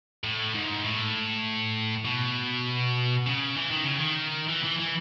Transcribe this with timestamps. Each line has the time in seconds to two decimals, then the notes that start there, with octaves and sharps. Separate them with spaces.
0.24 A2
0.54 G#2
0.84 A2
2.05 B2
3.26 C#3
3.57 E3
3.71 D#3
3.84 C#3
3.98 D#3
4.48 E3
4.64 E3
4.79 E3